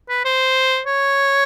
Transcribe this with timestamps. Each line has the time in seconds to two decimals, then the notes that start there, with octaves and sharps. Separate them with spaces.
0.09 B4
0.25 C5
0.87 C#5